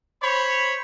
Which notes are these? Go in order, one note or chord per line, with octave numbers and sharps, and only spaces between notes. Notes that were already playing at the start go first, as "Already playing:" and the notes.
C5 C#5 B5